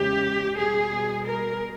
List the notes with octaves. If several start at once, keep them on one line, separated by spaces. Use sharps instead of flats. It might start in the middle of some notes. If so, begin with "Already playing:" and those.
Already playing: E2 C#3 G#3 G4
B2 G3 G#4
A#4